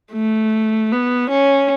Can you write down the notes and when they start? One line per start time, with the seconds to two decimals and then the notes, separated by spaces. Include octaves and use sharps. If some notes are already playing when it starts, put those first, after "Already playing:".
0.13 A3
0.92 B3
1.31 C#4